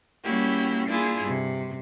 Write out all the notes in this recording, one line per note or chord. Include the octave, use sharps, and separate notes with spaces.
G3 A#3 C#4 E4 F#4 G4
A#3 D4 E4 F4 G#4
G2 C3